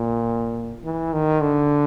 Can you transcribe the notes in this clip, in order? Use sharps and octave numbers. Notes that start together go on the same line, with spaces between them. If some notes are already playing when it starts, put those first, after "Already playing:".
Already playing: A#2
E3
D#3
D3